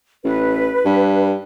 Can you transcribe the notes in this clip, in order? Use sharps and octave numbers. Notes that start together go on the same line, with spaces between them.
A1 B4
G2